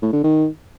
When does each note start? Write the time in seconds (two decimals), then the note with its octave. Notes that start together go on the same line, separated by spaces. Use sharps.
0.02 A2
0.13 D3
0.24 D#3